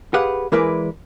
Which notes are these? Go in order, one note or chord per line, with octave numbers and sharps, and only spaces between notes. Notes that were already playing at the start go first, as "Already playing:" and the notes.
G4 G#4 B4 F5 F#5
E3 G#3 E4 A#4 B4 D5